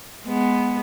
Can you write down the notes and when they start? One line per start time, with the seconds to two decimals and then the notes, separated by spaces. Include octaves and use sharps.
0.25 G#3 B3